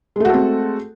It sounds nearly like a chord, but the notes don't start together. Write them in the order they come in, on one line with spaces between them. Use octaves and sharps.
G#3 A3 F#4 A4 C4